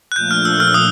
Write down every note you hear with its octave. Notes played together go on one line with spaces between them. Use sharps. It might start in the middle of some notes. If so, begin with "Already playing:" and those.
F#6
A#2 F3 A3 D4 G6
F6
E6
F6
E6
D#6